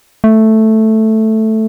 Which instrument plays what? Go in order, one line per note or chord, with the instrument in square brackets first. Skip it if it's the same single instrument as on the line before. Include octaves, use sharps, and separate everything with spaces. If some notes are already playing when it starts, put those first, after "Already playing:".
[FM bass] A3